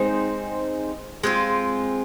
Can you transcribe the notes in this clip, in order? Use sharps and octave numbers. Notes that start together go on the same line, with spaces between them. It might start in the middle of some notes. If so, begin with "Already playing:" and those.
Already playing: G#3 C4 D#4 C5
G#3 C4 F4